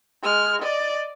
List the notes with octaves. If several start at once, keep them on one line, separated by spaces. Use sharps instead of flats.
G#3 F6
D5 D#5